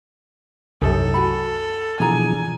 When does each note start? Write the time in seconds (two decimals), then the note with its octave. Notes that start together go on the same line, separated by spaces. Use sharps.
0.82 C2 F#2 D#4 A4
1.14 F#4 G#5 B5
2.00 B2 E3 F3 D4 G#4 G#5 A#5